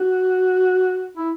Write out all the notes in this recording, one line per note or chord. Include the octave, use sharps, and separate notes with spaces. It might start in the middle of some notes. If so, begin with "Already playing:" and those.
Already playing: F#4
E4